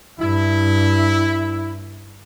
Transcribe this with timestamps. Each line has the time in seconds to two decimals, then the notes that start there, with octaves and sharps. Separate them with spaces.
0.20 G2 E4